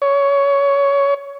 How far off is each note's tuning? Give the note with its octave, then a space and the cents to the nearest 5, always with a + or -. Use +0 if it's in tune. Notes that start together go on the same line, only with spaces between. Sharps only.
C#5 +15